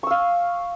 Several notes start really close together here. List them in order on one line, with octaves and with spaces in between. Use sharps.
C#6 E6 F5